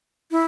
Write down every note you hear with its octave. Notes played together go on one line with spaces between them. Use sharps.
E4